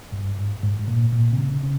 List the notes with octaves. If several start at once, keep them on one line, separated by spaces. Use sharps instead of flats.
G2
G#2
G#2
G#2
A#2
A#2
C3
C#3
C#3